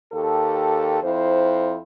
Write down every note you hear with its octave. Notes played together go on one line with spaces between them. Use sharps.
D#2 G4 A4
F2 E4 C5